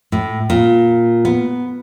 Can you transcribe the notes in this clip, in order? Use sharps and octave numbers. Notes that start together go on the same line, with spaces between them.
A2
A#2
B3